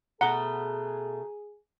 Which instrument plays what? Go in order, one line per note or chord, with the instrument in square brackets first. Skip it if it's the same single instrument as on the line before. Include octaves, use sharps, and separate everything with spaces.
[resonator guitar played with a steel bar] B2 A3 [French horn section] G#4 [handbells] F#5 [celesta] A#5 G7